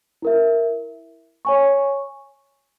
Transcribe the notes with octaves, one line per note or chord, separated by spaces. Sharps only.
E4 A#4 E5
C#5 G#5 C#6